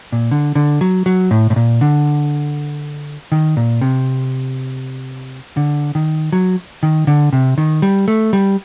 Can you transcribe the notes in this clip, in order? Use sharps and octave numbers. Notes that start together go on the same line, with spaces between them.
A#2
D3
D3
F#3
F#3
A2
A2
A#2
D3
D#3
A#2
C3
D3
D#3
F#3
D#3
D3
C3
D#3
G3
A3
G3